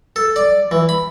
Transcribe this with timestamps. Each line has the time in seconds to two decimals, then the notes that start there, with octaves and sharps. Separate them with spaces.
0.16 A4
0.36 D5
0.71 E3
0.89 B5